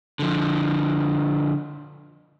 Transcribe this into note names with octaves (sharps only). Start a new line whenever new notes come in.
D3 F3